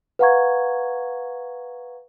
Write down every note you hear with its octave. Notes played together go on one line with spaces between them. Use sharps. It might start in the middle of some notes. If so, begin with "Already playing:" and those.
B4 F5 F#5 A#5 C#6 G#6